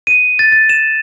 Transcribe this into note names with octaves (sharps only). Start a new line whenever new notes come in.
D#7
A6
A6
E7